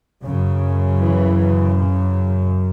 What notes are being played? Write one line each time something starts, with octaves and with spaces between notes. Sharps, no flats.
F#2 C#3
E3
C#3